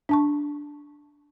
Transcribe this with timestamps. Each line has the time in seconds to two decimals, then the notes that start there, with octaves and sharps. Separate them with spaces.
0.09 D4 A5 C#6